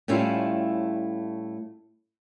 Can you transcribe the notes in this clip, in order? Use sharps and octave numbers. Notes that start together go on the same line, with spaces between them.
A2 G3 A3 C#4 E4 F4